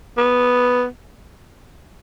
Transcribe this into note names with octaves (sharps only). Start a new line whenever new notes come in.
B3